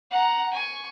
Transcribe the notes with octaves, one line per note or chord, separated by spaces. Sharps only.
F#5 A#5
G#5 C#6